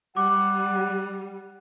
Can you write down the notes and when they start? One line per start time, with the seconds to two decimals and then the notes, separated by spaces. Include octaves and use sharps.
0.17 G3 F#5 D6